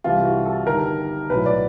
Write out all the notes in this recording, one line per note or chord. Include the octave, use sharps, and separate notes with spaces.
C2 C3 E3 G3 F4
F#4
A4
G1 G2 D#3 G3 A#4
B1 A2 F#3 B4
D5